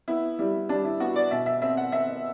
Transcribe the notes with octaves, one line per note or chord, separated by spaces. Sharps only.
B3 E4
G3 E4
G3 D4
E4
B3 F#4
D5
B2 E5
E5
C4 E5
F#5
C4 E5